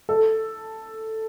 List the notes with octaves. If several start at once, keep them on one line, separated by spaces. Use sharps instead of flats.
A4